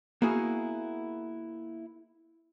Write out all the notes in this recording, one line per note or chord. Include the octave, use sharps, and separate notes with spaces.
A#3 B3 E4 F#4 G#4